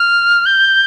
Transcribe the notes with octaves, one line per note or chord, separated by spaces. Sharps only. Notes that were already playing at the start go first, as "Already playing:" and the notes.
Already playing: F6
G6